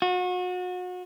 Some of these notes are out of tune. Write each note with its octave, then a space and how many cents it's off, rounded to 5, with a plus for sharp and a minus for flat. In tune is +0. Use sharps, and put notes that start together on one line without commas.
F#4 -35